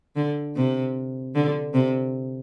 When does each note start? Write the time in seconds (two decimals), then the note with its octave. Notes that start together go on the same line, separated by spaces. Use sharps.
0.16 D3
0.56 C3
1.35 D3
1.74 C3